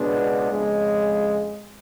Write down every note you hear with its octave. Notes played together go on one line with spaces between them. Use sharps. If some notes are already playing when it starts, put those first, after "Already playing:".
Already playing: C#2 B2 G#3 B3 D4
F2 C#3 G#3